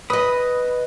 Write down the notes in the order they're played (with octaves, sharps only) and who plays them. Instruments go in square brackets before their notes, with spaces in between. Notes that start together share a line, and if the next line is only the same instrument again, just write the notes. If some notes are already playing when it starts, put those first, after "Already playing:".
[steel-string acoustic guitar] B4 D#5 [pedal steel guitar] B5 D#6